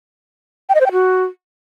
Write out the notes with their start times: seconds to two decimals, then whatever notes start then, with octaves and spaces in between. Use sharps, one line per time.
0.69 G5
0.75 D#5
0.80 C5
0.86 G5
0.92 F#4